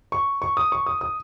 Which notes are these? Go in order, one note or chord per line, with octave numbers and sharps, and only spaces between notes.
C#6
C#6
D#6
C#6
D#6
D#6